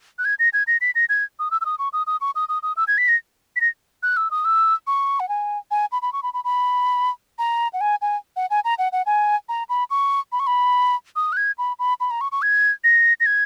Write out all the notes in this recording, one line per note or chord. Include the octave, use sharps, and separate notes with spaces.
F#6
G#6
A#6
G#6
A#6
B6
A#6
G#6
D#6
E6
E6
D#6
C#6
D#6
D#6
C#6
D#6
D#6
D#6
E6
G#6
B6
A#6
B6
A#6
F#6
E6
D#6
E6
C#6
F#5
G#5
G#5
B5
B5
C#6
B5
B5
B5
A#5
F#5
G#5
G#5
F#5
G#5
A#5
F#5
F#5
G#5
A#5
B5
C#6
B5
C#6
B5
D#6
F#6
G#6
B5
B5
B5
A#5
C#6
C#6
G#6
A#6
A#6
G#6